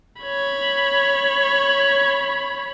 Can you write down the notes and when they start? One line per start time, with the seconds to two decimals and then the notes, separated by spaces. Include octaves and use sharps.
0.22 C#5 B5